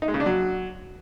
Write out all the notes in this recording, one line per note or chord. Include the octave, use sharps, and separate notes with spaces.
D#4
G#3
C#3
D4
F#3